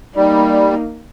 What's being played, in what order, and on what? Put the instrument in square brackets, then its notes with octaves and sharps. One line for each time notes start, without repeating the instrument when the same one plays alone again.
[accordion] G3 [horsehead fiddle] A#3 D#4